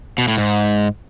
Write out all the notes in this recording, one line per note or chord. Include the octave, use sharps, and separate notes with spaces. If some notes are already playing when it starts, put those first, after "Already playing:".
B2
A2
G#2